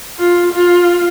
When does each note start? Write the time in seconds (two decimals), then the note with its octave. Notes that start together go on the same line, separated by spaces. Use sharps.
0.19 F4
0.53 F4